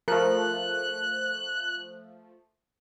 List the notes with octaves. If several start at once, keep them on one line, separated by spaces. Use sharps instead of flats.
F3 A3 A#4 F#6